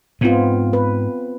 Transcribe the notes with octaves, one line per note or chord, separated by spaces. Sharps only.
G#2 B3 C4 F4
B4